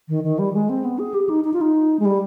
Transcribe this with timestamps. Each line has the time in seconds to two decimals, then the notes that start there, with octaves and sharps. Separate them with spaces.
0.09 D#3
0.24 D#3
0.39 G3
0.54 G#3
0.69 C4
0.85 B3
0.99 G#4
1.14 G4
1.29 D#4
1.44 D#4
1.53 F4
1.61 D#4
1.99 G#3
2.05 G3